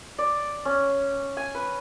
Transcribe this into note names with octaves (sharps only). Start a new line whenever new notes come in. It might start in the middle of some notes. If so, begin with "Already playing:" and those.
D5
C#4
G#5
B4